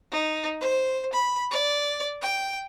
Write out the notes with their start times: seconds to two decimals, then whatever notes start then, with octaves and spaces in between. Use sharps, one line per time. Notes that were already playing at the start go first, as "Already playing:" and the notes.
0.12 D#4
0.61 C5
1.13 B5
1.51 D5
2.22 G5